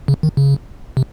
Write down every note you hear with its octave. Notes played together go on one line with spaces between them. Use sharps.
C#3
D#3
C#3
C3